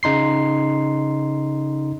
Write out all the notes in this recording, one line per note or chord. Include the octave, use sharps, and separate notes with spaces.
C#3 D#4 C6 C7